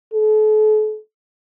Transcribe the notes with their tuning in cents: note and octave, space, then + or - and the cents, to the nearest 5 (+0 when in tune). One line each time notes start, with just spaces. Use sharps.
A4 -40